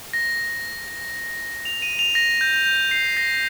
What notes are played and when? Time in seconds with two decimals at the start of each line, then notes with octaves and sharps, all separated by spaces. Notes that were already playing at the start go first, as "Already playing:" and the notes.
0.13 A#6
1.65 F7
1.82 D#7
1.99 F7
2.15 A#6
2.41 G6
2.54 G6
2.66 G6
2.91 C7
3.17 A#6